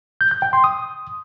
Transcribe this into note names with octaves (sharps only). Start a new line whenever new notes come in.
G6
G6
G5
C6
D#6